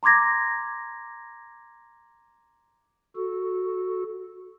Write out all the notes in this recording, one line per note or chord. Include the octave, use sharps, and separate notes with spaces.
A#5 C6 D6 G#6 A#6
F#4 A4